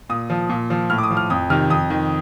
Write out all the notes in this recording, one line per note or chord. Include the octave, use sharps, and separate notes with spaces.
A#2 D#6
F3
A#2
F3
A2 F6
D6
D#6
F3
F6
F2 D#6
C3 D#3 F6
F2 D#6
D#3